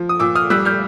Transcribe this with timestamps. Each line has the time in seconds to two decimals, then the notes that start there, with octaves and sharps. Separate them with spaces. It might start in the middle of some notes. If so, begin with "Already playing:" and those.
Already playing: F3
0.09 D#6
0.19 A#2 D6 E6
0.35 D#6 F6
0.50 G3 E6 F#6
0.65 F6 G6